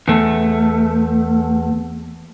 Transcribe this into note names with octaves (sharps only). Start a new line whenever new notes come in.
E2 A3